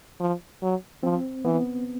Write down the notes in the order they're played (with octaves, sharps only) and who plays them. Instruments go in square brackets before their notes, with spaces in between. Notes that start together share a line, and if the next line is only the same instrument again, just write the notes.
[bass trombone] F3
F#3
[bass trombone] F3 [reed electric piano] C4
[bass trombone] E3 [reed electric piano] B3